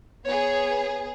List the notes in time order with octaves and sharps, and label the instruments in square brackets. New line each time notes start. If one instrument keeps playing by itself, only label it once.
[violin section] B3 G#4 [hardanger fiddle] C#5